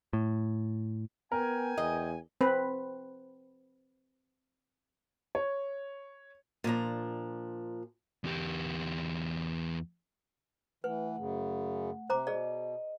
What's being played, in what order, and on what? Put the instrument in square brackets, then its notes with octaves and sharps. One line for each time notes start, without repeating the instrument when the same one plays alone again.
[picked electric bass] A2
[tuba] B3 [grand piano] A#4 [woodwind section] G5 G#5
[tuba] E2 [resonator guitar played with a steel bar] D#5
[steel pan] C4 B4
[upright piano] C#5
[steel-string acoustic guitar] A#2 F3 D4 A#5
[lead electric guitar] E2 G4
[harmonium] E3 [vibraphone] A3 F#5 [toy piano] B4
[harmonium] F#2 C#3
[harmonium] C3 [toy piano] C5 A#5 D6
[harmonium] B2 [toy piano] G#4 D5 [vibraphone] D#5